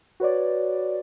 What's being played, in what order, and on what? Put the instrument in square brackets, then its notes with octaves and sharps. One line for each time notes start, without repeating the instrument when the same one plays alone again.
[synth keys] F#4 B4 C#5 D5